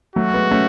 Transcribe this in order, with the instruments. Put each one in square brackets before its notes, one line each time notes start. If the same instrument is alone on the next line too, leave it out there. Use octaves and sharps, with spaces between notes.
[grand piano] F#3 A3 [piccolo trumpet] F#4
[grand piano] G#3 B3
A3 C#4